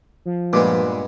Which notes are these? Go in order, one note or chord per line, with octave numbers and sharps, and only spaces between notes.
F3
G2 A#2 G#3 B3 B4 D6